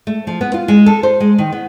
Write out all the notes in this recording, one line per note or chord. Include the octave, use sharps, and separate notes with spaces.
A3
F3
B3
F4
G#3
A4
C5
G#3
D#3
B3